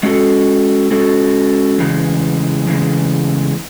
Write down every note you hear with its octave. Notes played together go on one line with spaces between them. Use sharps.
G#3 C#4 F#4 A4
G#3 C#4 F#4 A4
E2 C#3 E3 G#3
E2 C#3 E3 G#3